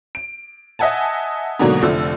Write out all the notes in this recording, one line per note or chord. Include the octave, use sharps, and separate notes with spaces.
D7
D#5 E5 F#5 G#5 A5
G#2 B2 D3 F#3 A#3
F1 D3 F3 A3 E6